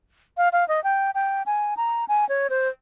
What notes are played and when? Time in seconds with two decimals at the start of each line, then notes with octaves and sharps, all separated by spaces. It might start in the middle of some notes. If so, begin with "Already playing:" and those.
0.37 F5
0.53 F5
0.68 D#5
0.84 G5
1.15 G5
1.46 G#5
1.77 A#5
2.08 G#5
2.29 C#5
2.50 C5